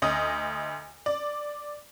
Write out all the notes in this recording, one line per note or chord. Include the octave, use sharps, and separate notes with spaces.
D2 D#5 D#6
D5